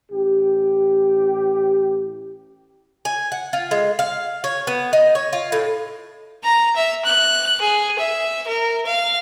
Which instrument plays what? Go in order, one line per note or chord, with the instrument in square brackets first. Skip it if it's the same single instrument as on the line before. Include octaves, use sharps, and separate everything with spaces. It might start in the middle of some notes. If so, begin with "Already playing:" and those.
[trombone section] A1 G4
[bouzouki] G#5
F#5
F4
G#3
F5
C#5
B3
D#4
C#5
F4
A2
[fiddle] A#5
E5
F#6
G#4
E5
A#4
F5